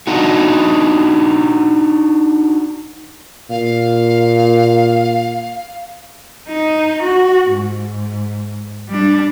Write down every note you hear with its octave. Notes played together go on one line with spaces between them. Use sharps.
D4 D#4 F#4
A#2 F5
D#4
F#4
G#2
G3 D4